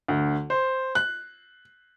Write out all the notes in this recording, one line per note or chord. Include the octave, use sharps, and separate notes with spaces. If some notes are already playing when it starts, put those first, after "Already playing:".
D2
C5
F#6